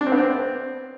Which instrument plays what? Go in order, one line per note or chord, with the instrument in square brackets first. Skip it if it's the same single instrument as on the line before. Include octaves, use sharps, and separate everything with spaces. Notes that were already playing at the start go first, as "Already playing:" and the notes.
[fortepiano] D4
C4
B3
C4